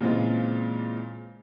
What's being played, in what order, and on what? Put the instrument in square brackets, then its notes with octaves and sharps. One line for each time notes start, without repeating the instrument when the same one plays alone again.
[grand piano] A#2 C#3 E3 G#3 C4 F4